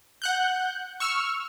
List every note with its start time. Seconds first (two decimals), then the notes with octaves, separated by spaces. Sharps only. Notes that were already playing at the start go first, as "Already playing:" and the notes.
0.22 F#5 F#6 G6
1.00 C#6 E6 F6